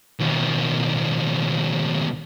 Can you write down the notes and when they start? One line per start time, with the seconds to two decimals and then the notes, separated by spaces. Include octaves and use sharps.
0.20 D#2 B2